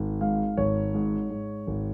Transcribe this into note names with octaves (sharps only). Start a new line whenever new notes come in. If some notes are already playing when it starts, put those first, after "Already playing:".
Already playing: G#1
G#2 F5
G#1 C#5
G#2
G#2
G#1